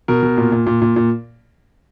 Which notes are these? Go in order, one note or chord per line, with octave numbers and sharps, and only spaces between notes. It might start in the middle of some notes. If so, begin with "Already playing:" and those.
B2 A#4
B2
A#2
A#2
A#2
A#2
A#2